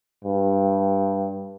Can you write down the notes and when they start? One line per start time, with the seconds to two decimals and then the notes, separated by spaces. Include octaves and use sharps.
0.25 G2